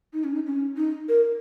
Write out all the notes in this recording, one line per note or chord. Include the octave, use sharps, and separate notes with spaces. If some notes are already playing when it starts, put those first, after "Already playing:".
D#4
C#4
D#4
C#4
D#4
A#4